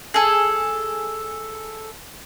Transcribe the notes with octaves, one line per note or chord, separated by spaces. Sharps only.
G#4 A4